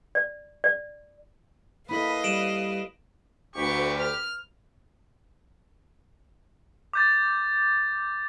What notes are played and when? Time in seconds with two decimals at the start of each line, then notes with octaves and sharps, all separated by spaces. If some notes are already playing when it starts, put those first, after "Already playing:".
0.15 D5
0.64 D5
1.89 A#3 E4 A4 B4 D#5 F5 B5
2.24 G3 D7 E7 F#7
3.56 D2 G4 B4 C#6
3.99 F6
6.93 D6 G6 A6